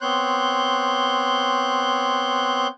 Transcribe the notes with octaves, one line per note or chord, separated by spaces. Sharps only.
B3 C4 C#5 C6 F#6 G6